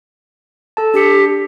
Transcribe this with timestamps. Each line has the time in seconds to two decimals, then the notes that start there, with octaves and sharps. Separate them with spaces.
0.77 A4 A5
0.94 D4 G4 C#7